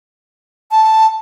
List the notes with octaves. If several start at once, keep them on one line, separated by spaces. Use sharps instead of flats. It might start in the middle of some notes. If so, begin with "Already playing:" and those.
A5